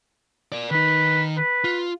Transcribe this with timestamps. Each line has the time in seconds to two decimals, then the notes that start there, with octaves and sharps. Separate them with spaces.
0.52 A#4 D5
0.71 D#3 D#4 B4
1.37 B4
1.64 F4